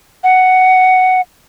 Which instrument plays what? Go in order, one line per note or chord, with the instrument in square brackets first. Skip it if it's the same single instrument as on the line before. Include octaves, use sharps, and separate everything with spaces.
[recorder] F#5